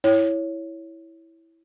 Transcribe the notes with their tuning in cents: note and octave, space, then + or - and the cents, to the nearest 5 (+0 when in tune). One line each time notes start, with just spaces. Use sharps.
E4 +0 C#5 +0